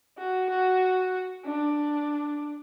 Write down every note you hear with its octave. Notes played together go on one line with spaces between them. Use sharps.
F#4
F#4
D4